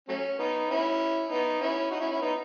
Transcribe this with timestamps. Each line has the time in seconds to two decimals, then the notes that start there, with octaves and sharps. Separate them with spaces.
0.08 F#3 A3 C#4
0.39 B3 D#4
0.70 C#4 E4
1.30 B3 D#4
1.61 C#4 E4
1.91 D#4 F#4
2.01 C#4 E4
2.11 C#4 E4
2.21 B3 D#4